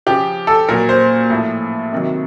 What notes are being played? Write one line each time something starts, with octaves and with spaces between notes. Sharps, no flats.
C#3 F3 G4
A4
A#2 F#3 A#4
C5
A2 F3
C3 D#3 F#3